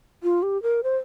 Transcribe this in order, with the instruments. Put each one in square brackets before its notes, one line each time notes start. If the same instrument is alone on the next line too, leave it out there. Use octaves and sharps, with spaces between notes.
[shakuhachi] F4
G4
A#4
C5